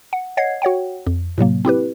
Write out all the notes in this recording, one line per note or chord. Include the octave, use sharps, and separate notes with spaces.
F#5
C#5 D#5 F#5 G#6 C7
F#4 C#5 F#5 G5
F2
A2 C3 F#3 A#3
C4 E4 G4 B4